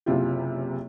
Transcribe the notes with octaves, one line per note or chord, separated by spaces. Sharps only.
F#1 C3 E4 F4 G4